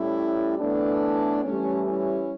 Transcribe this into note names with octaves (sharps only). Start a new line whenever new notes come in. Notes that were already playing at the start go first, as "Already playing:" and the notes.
Already playing: A2 G3 C#4 E4
A2 E3 A3 B3 D4
A2 E3 G3 A3 C#4
C#4 E4